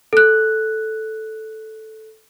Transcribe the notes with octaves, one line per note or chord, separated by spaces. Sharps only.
A4 F#6